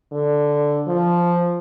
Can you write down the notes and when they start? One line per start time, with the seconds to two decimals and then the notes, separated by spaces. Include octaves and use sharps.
0.12 D3
0.87 F3